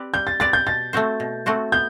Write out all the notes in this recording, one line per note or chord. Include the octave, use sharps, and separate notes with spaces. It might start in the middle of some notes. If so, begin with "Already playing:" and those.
Already playing: C4 G4 B4 D5
G3 G6
A6
C4 G4 B4 D5 A6
G6
B2 A6
A3 C4 F#4 C5
B2
A3 C4 F#4 C5
B3 G6